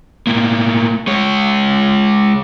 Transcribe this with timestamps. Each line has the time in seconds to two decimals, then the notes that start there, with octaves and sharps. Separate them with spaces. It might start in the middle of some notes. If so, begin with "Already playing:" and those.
0.27 A2 A#3
1.07 G#3 C#5